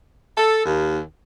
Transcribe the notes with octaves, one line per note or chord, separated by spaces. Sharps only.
A4
D#2